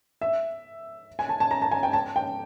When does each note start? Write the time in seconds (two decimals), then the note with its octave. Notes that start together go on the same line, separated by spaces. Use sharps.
0.21 E5
1.19 G#5
1.29 A5
1.40 A5
1.51 A#5
1.62 A5
1.71 G#5
1.83 G5
1.93 A5
2.16 G5